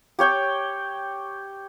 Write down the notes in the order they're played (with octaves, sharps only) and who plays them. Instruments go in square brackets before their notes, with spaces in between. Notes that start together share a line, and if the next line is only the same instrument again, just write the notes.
[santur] G4 C#5 G5